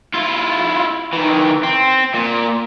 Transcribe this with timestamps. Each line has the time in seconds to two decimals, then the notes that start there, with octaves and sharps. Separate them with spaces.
0.14 E4 F4
1.13 D#3 E3
1.63 C4
2.14 A#2